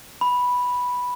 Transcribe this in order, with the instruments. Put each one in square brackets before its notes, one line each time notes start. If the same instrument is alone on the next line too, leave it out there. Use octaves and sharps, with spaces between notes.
[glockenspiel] B5